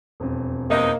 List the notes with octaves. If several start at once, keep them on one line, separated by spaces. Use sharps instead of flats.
E1 F2
G2 C3 A#3 D#4 D#5